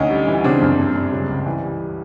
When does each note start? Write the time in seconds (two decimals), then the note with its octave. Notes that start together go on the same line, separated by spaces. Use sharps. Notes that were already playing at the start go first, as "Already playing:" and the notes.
Already playing: D2 C#4 D#4
0.10 G3
0.28 E3
0.44 C#3 C4 D4
0.61 F#2
0.79 G2
0.95 G2
1.13 C#3
1.29 C#2
1.46 E3
1.62 G3